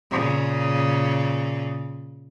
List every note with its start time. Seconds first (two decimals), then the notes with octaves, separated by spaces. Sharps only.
0.11 A#2 C#3